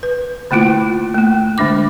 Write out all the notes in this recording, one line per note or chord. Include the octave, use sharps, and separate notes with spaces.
B4
D3 A3 A#3 E4 F4
A3 A#3
D3 G#3 D4 D6